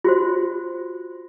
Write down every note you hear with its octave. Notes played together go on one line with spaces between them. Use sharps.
F4 F#4 C5